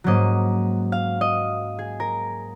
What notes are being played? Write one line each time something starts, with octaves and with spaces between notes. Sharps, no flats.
G#2 F#3 A#3 C#4 D#5
F5
D#5
G#4
A#4